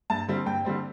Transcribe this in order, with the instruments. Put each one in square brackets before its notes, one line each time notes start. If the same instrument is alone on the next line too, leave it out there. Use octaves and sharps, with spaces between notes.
[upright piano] G2 A5
D3 G3 C4
G2 G5
D3 G3 C4